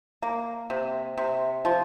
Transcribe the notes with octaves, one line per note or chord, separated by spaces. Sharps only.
A#3
C3
C3
F3